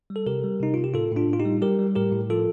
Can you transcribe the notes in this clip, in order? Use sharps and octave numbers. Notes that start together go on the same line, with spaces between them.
G3
A4
C3 G4 A#4
G3
C3 D#4
C3 F4
G4
A2 F4 A4
A2
D4 F4
A2
F4
D#4 G4
G3
G3 G4 A#4
G3
A2 G4 A#4
A2
F3 F4 A4